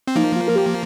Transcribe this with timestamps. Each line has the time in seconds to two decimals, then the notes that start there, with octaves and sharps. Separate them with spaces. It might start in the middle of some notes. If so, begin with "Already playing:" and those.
0.08 C4
0.16 F3 A#3 D#4
0.36 F4
0.48 A#4
0.56 G4